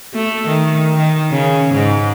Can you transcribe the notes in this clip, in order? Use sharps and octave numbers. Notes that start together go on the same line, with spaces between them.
A3
D#3
D#3
C#3
G#2